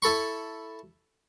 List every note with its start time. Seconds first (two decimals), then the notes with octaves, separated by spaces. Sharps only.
0.02 E4 A4 B5 C#6